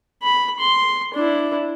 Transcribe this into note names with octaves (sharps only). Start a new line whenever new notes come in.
B5
C6
D4 E4